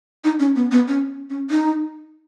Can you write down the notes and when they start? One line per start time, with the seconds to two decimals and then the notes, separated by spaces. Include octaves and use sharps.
0.24 D#4
0.40 C#4
0.56 B3
0.71 B3
0.88 C#4
1.30 C#4
1.50 D#4